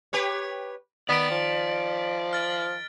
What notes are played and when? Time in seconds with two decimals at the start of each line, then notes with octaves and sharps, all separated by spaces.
0.13 G4 B4 C#5
1.09 D#3 B3 D5 B6 D7
1.30 F3
2.33 F6 A6